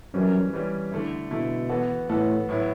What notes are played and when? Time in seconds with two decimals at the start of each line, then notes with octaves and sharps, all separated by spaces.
0.14 F#2 E3 G3 C#4
0.53 E3 G3 C#4
0.92 D3 A3 E4
1.31 B2 D3 A3 E4
1.69 E3 B3 F#4 A4
2.09 A2 E3 B3 F#4 A4
2.49 A2 F#3 B3 E4